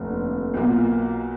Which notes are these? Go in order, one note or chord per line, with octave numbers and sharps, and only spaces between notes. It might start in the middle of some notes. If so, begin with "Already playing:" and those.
Already playing: F1 D#2 D3
B1 B2 A#3 F4